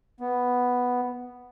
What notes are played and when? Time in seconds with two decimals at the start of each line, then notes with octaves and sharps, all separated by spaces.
0.20 B3